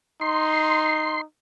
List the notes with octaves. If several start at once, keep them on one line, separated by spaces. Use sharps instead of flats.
D#4 C6